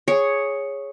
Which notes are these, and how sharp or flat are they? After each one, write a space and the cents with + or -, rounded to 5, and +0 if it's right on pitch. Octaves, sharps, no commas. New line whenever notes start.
G#4 +0 C#5 +0